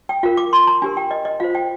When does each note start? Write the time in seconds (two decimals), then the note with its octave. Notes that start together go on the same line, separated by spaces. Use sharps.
0.09 G5
0.23 F4 A#4 F5
0.37 D6
0.53 C6
0.67 A#5
0.82 D4 G4 A#4 G#5
0.97 G5
1.11 D#5
1.25 D#5
1.40 F4 C5 F5
1.55 G5